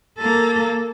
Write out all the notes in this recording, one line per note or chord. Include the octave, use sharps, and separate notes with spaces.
A#3 A4